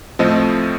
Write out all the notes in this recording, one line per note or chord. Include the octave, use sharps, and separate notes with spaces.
A2 F3 A3 C4 D#5